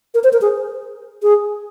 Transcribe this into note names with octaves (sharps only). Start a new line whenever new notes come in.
A#4
C5
A#4
G#4
G#4